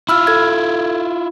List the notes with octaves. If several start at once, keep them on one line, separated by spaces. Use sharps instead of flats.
E4 F4 B5 E6 F6
A4 G#6